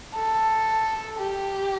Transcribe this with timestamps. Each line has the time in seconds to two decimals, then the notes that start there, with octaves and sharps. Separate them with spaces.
0.16 A4
1.19 G4